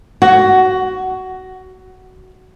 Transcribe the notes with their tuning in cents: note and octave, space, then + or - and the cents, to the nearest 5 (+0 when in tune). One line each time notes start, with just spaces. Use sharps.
F#4 +15